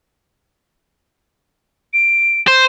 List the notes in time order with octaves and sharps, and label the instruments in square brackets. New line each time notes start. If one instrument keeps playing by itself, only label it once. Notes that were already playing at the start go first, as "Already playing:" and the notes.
[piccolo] D7
[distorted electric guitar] C5